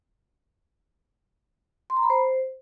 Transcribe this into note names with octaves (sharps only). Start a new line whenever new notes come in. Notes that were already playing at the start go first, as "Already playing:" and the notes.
C6
A#5
B5
C5